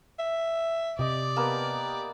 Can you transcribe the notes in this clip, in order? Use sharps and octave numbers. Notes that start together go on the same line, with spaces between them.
E5
C3 G4 D5 D#5
A#3 B3 G4 A5